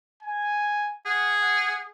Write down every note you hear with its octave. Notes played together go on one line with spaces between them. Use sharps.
G#5
G#4 F#5
F#5